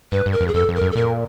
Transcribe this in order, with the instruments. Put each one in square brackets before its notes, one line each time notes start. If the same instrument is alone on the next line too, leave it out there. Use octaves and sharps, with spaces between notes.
[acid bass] G2 [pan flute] B4
[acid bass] G2
[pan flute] A#4
[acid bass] F2
[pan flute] G#4
[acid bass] F2 [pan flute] A4
[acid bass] F2
[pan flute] A#4
[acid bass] F#2
[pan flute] A4
[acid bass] A#2 [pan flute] A#4